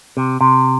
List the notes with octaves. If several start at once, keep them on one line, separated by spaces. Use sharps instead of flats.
C3
C3